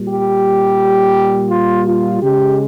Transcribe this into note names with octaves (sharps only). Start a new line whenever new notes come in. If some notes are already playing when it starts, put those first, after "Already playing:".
Already playing: A#2 G3
G4
F4
F4
C#3 G#3 G4